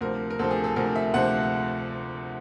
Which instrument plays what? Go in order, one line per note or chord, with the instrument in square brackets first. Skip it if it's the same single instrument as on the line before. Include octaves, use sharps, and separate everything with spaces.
[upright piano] D2 C3 F3 A#4
A#4
D2 C3 F3 A4
G#4
A4
D2 C3 F3 A#4
E5
D2 C3 F3 F#5